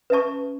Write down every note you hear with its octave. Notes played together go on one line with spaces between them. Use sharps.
C#4 B4 E5 A5 C#6